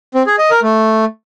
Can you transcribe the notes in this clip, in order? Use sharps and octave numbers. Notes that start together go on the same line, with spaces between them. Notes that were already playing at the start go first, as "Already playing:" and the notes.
C4
G#4
D#5
A#4
A3